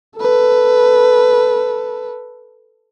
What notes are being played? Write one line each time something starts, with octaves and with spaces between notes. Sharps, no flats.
A4 B4